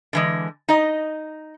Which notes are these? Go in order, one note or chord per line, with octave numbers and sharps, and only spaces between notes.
D3 E3 G#3
D#4 D#5